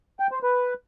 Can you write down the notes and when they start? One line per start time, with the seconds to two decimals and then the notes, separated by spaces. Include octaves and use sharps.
0.20 G5
0.31 C5
0.43 B4